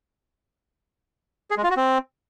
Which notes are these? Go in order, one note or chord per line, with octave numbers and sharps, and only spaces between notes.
G#4
G#3
F4
F#4
C4